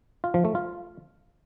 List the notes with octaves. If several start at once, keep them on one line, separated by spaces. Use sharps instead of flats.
F4
F3
A3
F4